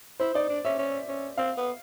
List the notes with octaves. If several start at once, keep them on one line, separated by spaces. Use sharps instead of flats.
E4 C5
D#4 D5
D4
C#4 E5
C#4
C#4
C4 F5
B3